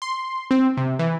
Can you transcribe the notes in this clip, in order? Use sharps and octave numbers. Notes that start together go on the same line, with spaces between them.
C6
C4
C3
E3